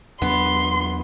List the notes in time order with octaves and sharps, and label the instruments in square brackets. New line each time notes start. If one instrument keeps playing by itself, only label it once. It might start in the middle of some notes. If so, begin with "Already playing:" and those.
[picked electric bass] E2 F#3 D4 [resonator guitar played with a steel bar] B3 [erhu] C6